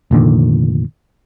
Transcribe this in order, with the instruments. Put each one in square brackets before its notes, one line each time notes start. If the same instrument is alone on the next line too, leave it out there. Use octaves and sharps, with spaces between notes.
[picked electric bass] F1 A#2 D3 D#3